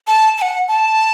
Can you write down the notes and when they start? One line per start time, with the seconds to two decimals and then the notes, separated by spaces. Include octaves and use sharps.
0.07 A5
0.38 A5
0.42 F#5
0.68 A5